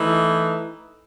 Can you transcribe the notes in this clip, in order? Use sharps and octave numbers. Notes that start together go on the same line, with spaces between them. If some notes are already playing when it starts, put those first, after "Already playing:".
Already playing: E3 A3 D#4